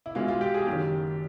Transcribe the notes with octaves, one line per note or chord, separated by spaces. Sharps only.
E4
B1 B2 G#3 F4
F4
G4
G#4
F#1 F#2 D#3 G4